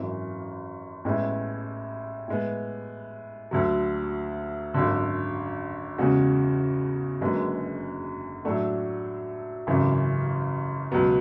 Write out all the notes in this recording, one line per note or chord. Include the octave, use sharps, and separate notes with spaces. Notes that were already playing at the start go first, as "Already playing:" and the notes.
Already playing: G#1 F#2 E3
A1 A2 G#3 B3 E4
A2 G#3 B3
D2 D3 F#3
G#1 F#2 D3
E2 C#3 G#3 C#4 F#4
F#1 F#2 D3 G#3 B3
A2 F#3 A3 D4 F#4
G#1 F#2 C#3 E3
C#2 B2 F#3 B3